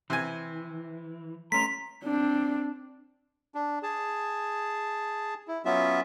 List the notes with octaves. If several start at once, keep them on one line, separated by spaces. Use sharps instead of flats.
C3 E3 G#5
A3 C#4 A#5 C6 B6
C4 D4
D4
G#4 A5
E4
F#3 B3 C#4 F4 E5